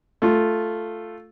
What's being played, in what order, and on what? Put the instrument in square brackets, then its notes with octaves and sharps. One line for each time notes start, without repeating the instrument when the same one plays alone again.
[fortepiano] A3 F4